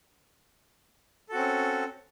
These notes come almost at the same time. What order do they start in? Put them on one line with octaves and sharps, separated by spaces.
A4 F#4 C4 C#4